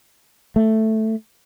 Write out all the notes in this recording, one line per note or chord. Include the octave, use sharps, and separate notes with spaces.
A3